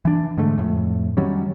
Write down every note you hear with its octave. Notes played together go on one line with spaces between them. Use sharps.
E3 D4
G#2 D3 A3
F2 A2
D#3 F#3 G3 C#4